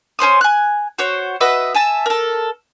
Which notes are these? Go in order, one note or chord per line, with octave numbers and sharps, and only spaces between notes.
C#4 C5 C6 D#6
G#5 F#6
F#4 C5 C#5
F#4 B4 D#5 E5
E5 G#5 A5
A4 A#4